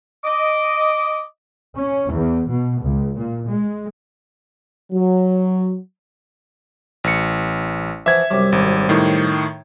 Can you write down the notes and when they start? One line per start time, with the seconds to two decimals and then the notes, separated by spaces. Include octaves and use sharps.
0.24 D#5 D6
1.77 C#4
2.12 E2
2.51 B2
2.82 C#2
3.17 A#2
3.49 G#3
4.92 F#3
7.04 A1 C#7
8.06 E3 F3 E5 F#5 G#6
8.30 C2 F#2 G3
8.52 G#1
8.89 A2 D#3